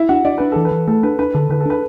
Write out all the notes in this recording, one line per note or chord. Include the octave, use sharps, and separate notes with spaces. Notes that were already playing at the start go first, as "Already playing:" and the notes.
Already playing: E4 E5
D4 F#4 F#5
D4 D5
D4 B4
E3 A4
B4
E3
A3 A4
D4 B4
D4 B4
D3 A4
D3 B4
A4
D4 B4